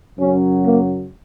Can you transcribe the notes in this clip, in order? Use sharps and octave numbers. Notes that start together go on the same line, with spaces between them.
F#2 C#3 F#3 C#4
A#3